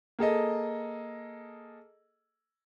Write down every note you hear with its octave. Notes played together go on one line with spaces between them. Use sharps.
A#3 G#4 A4 D#5